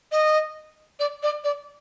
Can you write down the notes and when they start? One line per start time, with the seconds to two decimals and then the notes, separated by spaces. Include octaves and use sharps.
0.12 D#5
1.00 D5
1.23 D5
1.44 D5